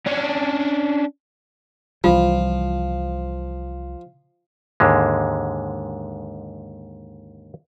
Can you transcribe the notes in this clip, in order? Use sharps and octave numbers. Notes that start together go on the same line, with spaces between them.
C#4 D4
C2 E3 F3 G3 F4
D#2 G#2 D3 G#3